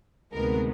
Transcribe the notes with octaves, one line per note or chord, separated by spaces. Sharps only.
D2 C3 D#3 G#3 B3 A#4